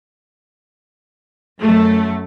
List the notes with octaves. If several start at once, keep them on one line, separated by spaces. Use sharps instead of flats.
F#2 A3